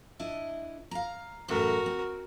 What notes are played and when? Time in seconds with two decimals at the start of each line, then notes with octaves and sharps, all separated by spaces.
0.19 D4 E4 D#5
0.91 F5 A#5
1.48 F#2 A2 E3 F#4 A#4
1.86 C4